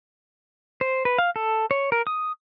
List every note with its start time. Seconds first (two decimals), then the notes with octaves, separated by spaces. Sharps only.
0.81 C5
1.05 B4
1.18 F5
1.36 A4
1.71 C#5
1.92 A#4
2.07 D#6